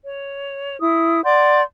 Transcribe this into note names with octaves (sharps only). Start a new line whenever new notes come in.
C#5
E4 D#6
D5 F#5 C6 G6